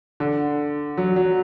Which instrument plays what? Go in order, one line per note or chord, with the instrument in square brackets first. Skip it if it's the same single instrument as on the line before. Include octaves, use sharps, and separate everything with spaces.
[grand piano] D3
F#3
F#3